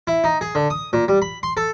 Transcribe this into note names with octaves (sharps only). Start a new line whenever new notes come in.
E4
D#4
G#4
D3
D#6
A#2
G3
B5
C6
A4